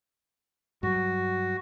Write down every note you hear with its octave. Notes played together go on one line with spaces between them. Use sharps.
G2 F#3 F#4